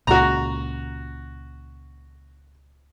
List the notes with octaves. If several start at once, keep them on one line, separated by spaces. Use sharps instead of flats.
C#2 A#2 F#4 A#5